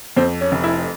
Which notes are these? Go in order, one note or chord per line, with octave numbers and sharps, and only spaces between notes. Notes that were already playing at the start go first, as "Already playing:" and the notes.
F2 C4
C#4
F1
E4